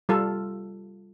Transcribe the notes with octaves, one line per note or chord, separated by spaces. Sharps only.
G3 F4 A4